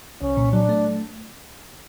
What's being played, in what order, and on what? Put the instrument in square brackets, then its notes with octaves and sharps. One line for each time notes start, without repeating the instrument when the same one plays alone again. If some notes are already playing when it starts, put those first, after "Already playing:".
[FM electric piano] C2 [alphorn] C#4
[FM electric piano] A#2
[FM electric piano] F#3 [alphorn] D4
[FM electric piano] A3